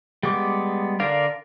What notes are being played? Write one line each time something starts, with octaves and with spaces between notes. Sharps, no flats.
G3 G#3 B3 D6
D3 D4 A#4 D5 F5